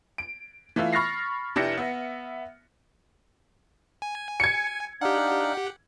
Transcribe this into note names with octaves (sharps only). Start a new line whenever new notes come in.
D7
E3 A3 F4 E5
B5 C#6 F6 A6 A#6 C7
F1 D4 E4 G4 A#6 C#7
B3 E5
G#5
G#6 C#7
D4 D#4 G4 F5 F#5